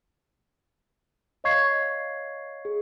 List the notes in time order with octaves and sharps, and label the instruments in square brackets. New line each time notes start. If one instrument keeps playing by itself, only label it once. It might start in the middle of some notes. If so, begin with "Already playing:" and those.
[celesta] C#5 D#5 F5 C#6 G#6 C7
G#4